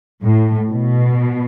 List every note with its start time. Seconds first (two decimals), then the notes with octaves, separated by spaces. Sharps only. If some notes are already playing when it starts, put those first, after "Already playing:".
0.22 A2
0.70 B2